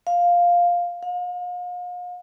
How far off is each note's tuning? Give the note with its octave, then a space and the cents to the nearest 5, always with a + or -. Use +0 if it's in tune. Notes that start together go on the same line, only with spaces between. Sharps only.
F5 +5
F5 +40